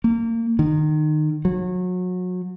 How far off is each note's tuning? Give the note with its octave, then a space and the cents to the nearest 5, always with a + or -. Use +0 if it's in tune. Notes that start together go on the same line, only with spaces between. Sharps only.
A#3 -30
D#3 -25
F#3 -30